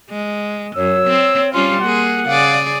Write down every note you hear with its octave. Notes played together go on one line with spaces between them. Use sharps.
G#3
F#2 C#5 E6
C4
G3 C#4 F4 F5 C6
A#3 G#4 F#5
C#3 G#4 D5 F5